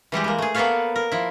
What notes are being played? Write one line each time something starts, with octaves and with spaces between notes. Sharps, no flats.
E3 G3 G#3 G4
G#3 A#3
A3 G#4
A#3 B3 A4 B4 C#5 F5
A#4
F3 E4